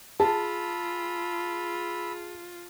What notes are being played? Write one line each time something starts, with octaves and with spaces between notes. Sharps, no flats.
F4 G#4 A5 B5 E6